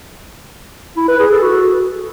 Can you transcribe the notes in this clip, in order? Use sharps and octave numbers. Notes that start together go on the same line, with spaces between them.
E4
B4
G#4
A4
F#4